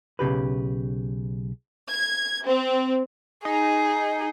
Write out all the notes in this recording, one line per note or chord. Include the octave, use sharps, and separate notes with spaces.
B1 C#3 G4 B4
G#6
C4
D#4 G#4